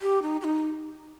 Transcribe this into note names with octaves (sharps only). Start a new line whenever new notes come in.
G4
D#4
G4
D#4